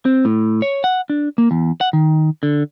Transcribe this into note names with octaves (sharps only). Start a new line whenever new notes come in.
C4
A2
C#5
F#5
D4
A#3
E2
F#5
D#3
D3